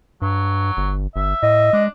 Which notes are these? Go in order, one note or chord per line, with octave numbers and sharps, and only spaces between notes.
G2 F#3
G1
G1 E5
A2 D#5
G#3 D4